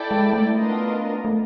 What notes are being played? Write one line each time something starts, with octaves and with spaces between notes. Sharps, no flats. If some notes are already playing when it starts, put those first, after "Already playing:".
Already playing: E4 A4 D5 G5
G#3
A3
B3 D4 F4 A#4 D#5
A3